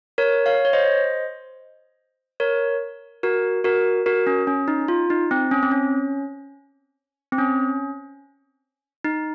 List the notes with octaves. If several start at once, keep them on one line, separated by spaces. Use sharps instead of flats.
A#4 C#5
C#5 F5
C#5
C5 D#5
A#4 C#5
F#4 A#4
F#4 A#4
F#4 A#4
C#4
C#4
D#4
F4
D#4
C4
C#4
C4
C#4
C4
C#4
D#4